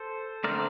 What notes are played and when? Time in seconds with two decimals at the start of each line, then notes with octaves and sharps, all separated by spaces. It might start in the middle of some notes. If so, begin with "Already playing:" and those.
Already playing: A4 C5
0.44 D3 A3 C4 A#4 D5